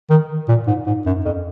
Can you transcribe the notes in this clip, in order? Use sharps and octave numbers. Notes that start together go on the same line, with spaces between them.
D#3
A#2
G#2
G#2
F#2
F2